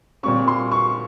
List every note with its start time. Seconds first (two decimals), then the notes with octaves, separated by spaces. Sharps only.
0.23 A#2 G3 C4 C#6
0.48 C6
0.71 C#6